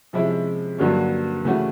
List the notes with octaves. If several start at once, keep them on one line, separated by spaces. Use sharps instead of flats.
C3 F3 G#3 C#4 E4
G2 D3 F#3 A#3 C#4
C#3 E3 A3 C#4 F#4